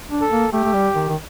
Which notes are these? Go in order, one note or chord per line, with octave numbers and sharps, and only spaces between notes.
D4
A4
A#3
A3 G4
A3
G3
D#3
D#3